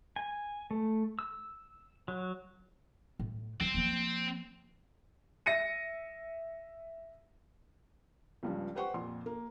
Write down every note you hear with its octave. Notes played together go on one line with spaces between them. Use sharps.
G#5
A3
E6
F#3
A2
F3 G3 C4
F3 A#3
E5 A#6 C#7 D#7
C#2 G2 F3
G4 B4 C5 F#5 G5 C#6
F2 A#2 C6
A#3